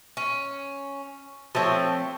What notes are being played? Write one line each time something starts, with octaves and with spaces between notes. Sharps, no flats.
C#4
F3 A3 C4 C#5